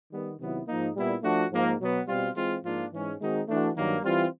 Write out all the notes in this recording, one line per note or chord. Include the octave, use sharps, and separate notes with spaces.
D#3 G3 B3
C3 D#3 F#3 B3 E4
G#2 F3 A#3 D#4
A#2 G3 B3 E4
F3 A3 D4 F#4
G#2 F3 A#3
B2 F#3 B3
B2 G3 C4 F4
E3 G#3 C4 F4
G#2 F3 A#3 D4 F4
G#2 E3 G#3 C#4
D#3 G#3 C4 D#4 F#4
E3 A3 D4 F#4
G2 D#3 F#3 A#3
E3 G3 C4 F4